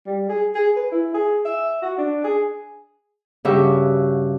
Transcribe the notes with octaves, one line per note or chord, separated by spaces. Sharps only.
G3
G#4
G#4
B4
E4
G#4
E5
F#4
D4
G#4
G2 C#3 F#4 G4 E5